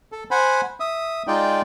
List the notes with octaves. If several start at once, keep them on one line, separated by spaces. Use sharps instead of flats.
A4
C5 F#5 G#5 B5
E5 D#6
G#3 D#4 F4 D5 G5